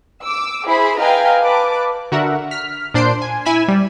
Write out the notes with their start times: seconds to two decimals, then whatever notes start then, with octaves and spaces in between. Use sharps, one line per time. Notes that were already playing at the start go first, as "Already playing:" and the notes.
0.22 D6 E6
0.66 E4 G#4 C5 B5
0.98 B4 D#5 F5 G5 G#5 A#5
1.43 B4 A5 D6
2.12 D3 F#4 A#4 E5 F#5
2.51 F6 B6
2.94 A#2 D4 C5 C6 C7 D7
3.22 G#5
3.45 E4 G#5 B5 B6 E7
3.68 G3